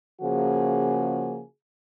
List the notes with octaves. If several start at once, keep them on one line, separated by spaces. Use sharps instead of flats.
C#3 F3 A#3 F#4 G#4